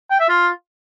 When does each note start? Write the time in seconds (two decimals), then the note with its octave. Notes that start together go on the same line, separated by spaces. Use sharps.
0.10 G5
0.20 E5
0.29 F4